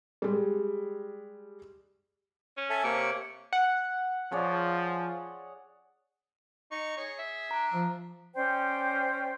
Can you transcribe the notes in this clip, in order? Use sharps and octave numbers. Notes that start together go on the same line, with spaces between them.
G3 G#3
C#4
A4 E5 G#5
C3 A#3 C#5 C#6
F#5
F3 G#4 C#5 D5
D#4 C#6
G#4 C#5
E5
D4 A#5
F3
C#4 C5 D5 G5